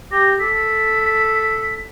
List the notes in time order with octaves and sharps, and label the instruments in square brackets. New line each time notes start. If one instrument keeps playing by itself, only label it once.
[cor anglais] G4 [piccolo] A#6
[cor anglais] A4 [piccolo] B6